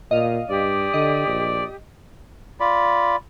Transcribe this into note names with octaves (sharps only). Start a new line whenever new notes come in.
A#2 D#5 F5
G2 G4 D5 D#6
D3 D#5
A#1
F4 D5 B5